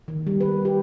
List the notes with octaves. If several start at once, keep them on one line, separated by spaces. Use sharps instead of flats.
D#3
G3
B4
G4